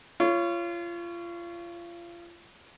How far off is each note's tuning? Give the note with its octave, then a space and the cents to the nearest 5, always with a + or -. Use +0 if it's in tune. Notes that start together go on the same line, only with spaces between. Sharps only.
F4 -30 C#5 +5